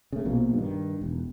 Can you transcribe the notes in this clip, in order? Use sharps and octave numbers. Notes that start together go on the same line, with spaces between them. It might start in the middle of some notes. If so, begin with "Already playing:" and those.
C#3 A3
A#1 B2 F3 A#3
G2 D#3
E1